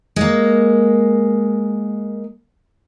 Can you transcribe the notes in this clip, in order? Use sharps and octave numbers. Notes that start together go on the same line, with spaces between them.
G#3 A#3